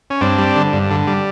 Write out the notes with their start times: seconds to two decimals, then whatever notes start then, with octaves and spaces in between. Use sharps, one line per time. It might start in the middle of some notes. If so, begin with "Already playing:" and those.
0.10 C#4
0.21 G2 C4 D4
0.38 G3
0.56 D3
0.73 G2
0.90 D3
1.07 G3